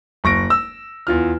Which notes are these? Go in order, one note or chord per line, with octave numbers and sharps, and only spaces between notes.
F#1 C#6 A#6 D7
E6
E2 F4 F6